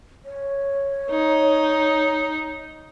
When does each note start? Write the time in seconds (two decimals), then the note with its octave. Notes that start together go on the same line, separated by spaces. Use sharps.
0.25 C#5
1.11 D#4